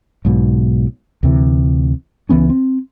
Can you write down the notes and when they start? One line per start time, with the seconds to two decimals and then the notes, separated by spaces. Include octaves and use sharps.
0.25 B1 G#2 B2
1.23 D2 C3 E3
2.29 C#2 E3 B3 C#4
2.50 C4